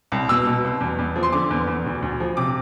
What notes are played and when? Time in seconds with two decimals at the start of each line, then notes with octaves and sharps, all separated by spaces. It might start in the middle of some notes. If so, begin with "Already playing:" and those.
0.12 C2
0.29 B2 E6
0.47 B2
0.64 C2
0.81 E2
0.99 E2
1.16 F3
1.23 C6
1.33 D3 D6
1.51 E2
1.67 E2
1.86 D2
2.02 D2
2.20 F3
2.37 C3 D6